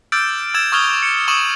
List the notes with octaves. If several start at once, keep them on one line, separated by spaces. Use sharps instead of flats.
D6 E6 F6 G6 A6 D7
E6 G#6 A6 D7 E7
C#6 D#6 F6 G#6 F7 G7
C#7
C#6 D#6 D#7 E7 F#7